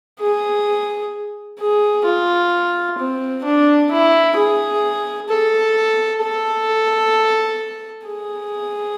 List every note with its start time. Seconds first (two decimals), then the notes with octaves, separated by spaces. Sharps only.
0.20 G#4
1.60 G#4
2.05 F4
2.98 C4
3.45 D4
3.91 E4
4.37 G#4
5.30 A4
6.22 A4
8.08 G#4